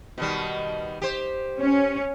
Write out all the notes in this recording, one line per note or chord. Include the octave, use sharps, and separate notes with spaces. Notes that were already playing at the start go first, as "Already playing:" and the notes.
B2 D#3 G3
G4 C5
C#4